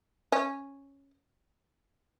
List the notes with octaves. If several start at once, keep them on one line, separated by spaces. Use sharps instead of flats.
C#4